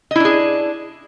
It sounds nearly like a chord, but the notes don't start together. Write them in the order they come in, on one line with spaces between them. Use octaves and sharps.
D#5 E4 D4 G#4